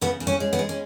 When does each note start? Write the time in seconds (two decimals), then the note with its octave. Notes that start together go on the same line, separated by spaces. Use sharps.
0.01 C#3 B3
0.20 C#3
0.27 C#4
0.40 G#3
0.53 B3
0.59 G#3
0.69 C#4